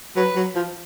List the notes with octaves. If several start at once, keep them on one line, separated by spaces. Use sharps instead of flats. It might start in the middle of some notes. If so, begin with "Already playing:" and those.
F#3 B4
F#3
F3